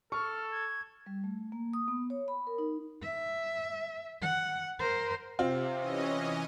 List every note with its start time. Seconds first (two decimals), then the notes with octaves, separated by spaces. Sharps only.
0.12 A4 C#6 F6
0.51 G#6
1.06 G3
1.24 A3
1.52 A#3
1.73 D#6
1.88 B3
2.10 C#5
2.28 B5
2.47 A#4
2.58 D#4
3.03 E5
4.22 F#5
4.80 A#4 C5
5.39 C3 C4 F4
5.77 E3 C#4 D#5